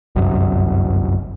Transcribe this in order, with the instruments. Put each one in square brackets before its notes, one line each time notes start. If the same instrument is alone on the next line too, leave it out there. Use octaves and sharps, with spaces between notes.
[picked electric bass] G1 C2 F#2